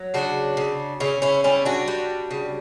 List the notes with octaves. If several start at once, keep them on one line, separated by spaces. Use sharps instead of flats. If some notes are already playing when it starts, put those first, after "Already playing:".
Already playing: F#3
C#3 D4 F#4
C#3
C#3 C#4 E4
C#4 E4
G3 C#4 E4
D4 F#4
G3
C#3